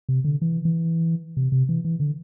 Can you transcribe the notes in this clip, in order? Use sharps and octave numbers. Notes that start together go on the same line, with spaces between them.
C3
D3
E3
E3
C3
C3
E3
E3
D3